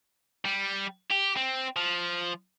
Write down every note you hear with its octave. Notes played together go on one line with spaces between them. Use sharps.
G3
G4
C4
F3